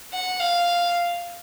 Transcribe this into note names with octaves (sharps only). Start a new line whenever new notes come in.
F#5
F5